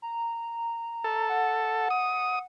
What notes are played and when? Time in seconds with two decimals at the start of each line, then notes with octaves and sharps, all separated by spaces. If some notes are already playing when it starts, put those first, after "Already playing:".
0.02 A#5
1.04 A4
1.29 F#5
1.90 D#6